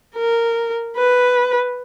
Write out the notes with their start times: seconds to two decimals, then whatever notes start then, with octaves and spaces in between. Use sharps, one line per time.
0.16 A#4
0.97 B4